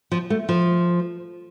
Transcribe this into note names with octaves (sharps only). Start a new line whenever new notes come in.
F3
A3
F3